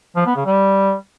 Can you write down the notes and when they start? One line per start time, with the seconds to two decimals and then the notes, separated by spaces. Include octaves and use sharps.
0.16 F3
0.26 B3
0.36 C#3
0.46 G3